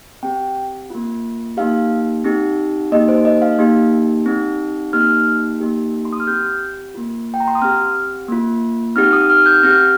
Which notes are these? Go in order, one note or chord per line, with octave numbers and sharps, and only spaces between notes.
C4 G4 G5
A#3 F4
A#3 D#4 G4 F5
C4 D#4 G4
A#3 D#4 G4 D#5
C5
D#5
F5
A#3 D#4 G4
C4 D#4 G4
A#3 D#4 G4 F6
A#3 D#4 G4
C6
D#6
F6
C4 G4 G6
A#3 F4
G5
A#5
C6
D#6
C4 G4 F6
A#3 F4
C4 D#4 G4 F6
D#6
F6
G6
C4 G4 F6